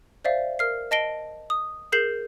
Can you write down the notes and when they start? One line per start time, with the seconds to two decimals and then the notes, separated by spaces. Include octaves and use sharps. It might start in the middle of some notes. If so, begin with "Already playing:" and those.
0.25 C5 D5 E5 F5
0.59 A#4 F6 C7
0.91 D#5 A5 A#6 C7 D7 G7
1.50 D#6
1.92 G#4 A#4 G6 C7 E7 F#7